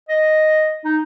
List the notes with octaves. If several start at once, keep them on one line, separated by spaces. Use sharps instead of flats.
D#5
D#4